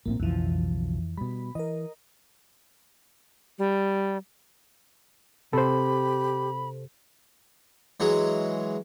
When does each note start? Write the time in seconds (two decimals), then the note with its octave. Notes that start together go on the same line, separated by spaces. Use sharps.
0.06 A#1 A2 A#3 C4
0.20 B1 F2 C#3 E3 F3
1.17 B2 G3 B5
1.55 E3 A#4 D#5
3.58 G3
5.53 C3 G4 A4 C5 B5
8.00 E3 F#3 G#3